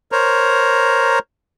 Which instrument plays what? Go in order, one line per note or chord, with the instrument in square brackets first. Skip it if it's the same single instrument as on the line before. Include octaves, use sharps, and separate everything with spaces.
[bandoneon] A#4 C5 C#5 A#5